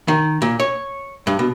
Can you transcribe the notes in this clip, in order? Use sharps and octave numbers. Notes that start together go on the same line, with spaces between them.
D#3
A#2
C#5
G2
B2